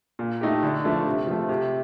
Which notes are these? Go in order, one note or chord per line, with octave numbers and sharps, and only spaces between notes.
A#2
A3 D#4 G4
D3
F3 A3 D4
C3
F3 A3
C3